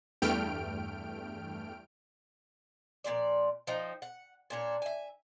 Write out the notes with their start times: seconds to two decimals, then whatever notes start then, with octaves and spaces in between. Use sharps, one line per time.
0.22 E2 G2 A3 G5 F6 D7
3.04 A#2 C#3 F3 D5
3.67 F3 D#4 G5
4.02 F#5
4.50 A#2 D4 C#5
4.82 E5 G#5